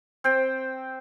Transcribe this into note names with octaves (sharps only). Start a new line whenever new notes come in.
C4 C5 G5